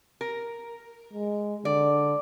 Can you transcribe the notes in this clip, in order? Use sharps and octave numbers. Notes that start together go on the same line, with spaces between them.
A#4
G#3
D3 D5